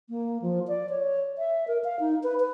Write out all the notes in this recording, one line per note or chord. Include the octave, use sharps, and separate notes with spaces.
A#3
F3
D5
C#5
E5
A#4
F5
D#4
B4
B4